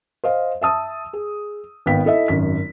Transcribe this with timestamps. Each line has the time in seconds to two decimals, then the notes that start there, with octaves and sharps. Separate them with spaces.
0.24 C5 D#5 F5
0.61 E5 A5 D#6 E6
1.13 G#4
1.86 G#1 B3 F5 G5 B6
2.05 E4 A4 D#5 E5
2.28 G#1 F#2 B6